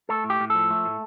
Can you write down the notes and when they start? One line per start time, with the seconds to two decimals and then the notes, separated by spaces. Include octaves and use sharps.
0.09 A3 A4
0.24 A2
0.30 G4
0.40 A2
0.50 A4
0.55 F3
0.71 A3
0.85 A2